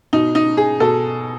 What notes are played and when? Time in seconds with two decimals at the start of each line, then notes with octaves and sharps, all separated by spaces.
0.13 B2 D#4
0.35 D#4
0.57 G#4
0.80 B2 A4